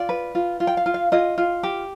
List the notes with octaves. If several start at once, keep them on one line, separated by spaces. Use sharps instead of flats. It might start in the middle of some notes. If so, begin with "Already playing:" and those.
Already playing: F4 D5
B4
F4
F4
G5
F5
F4
F5
F4 D#5
F4
G4